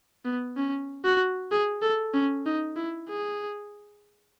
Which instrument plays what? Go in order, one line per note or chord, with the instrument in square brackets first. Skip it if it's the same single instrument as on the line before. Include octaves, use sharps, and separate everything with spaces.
[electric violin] B3
C#4
F#4
G#4
A4
C#4
D#4
E4
G#4